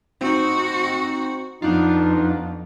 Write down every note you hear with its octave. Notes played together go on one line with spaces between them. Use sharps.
C4 D#4 F#4
F2 B3 D4 D#4 F4